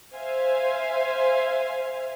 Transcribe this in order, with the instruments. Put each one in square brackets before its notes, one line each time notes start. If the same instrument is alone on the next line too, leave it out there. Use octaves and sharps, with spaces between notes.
[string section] C5 E5 F5 G#5